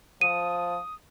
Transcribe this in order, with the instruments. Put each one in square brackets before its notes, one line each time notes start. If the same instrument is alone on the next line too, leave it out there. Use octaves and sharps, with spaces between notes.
[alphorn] F3 [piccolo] D#6 [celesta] D#7